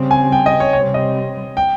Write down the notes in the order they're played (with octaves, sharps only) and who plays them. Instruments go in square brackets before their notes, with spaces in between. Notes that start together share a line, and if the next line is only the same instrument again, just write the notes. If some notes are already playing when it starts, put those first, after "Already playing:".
Already playing: [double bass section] C#3 G3 C4
[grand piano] G#5
G5
D#5
C#5
[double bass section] C3 G3 C4 [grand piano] C#5
[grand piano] D#5
G5